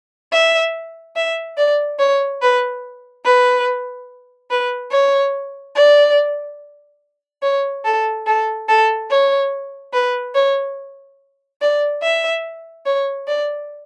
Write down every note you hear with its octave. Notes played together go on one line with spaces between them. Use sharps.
E5
E5
D5
C#5
B4
B4
B4
C#5
D5
C#5
A4
A4
A4
C#5
B4
C#5
D5
E5
C#5
D5